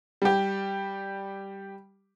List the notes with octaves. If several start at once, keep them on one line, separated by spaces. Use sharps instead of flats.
G3 G4